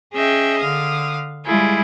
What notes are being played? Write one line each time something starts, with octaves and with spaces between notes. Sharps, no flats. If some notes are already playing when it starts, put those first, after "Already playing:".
C#4 G#4 D#5 E5 G5
D3 F5 D#6
G3 G#3 E4 F4 G#4